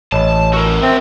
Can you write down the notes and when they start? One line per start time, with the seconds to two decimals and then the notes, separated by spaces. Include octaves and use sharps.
0.12 A1 C#5 D#5 A5 B5
0.53 F#4 A#4 E6
0.82 C4 E5